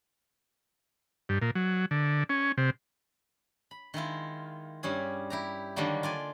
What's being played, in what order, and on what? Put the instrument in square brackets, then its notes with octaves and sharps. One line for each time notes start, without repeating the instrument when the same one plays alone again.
[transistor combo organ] G2
A#2
F#3
D3
C#4
C3
[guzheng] B5
D#3 G#3 E4 F4
G2 G3 C#4 G#4
E4 G4 A#5
D3 D#3 F#3 G3 A#3
F4 D5 G#5